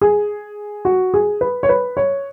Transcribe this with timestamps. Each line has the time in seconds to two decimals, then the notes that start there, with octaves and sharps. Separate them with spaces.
0.01 G#4
0.85 F#4
1.14 G#4
1.41 B4
1.63 C#5
1.69 B4
1.97 C#5